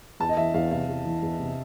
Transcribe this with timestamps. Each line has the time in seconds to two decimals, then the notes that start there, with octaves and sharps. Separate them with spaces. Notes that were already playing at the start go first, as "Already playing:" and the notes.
0.20 E2 A5
0.29 D#5
0.37 E3 E5
0.54 E2 F5
0.71 C3 F5
0.88 E2
1.05 E3
1.22 E2
1.39 C3